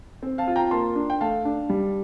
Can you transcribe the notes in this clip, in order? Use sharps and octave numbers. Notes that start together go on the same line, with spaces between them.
C4
F5 A5
F4
G5 A#5
A#3 A5 C6
D4
G5
A3 F5 A5
D4
G3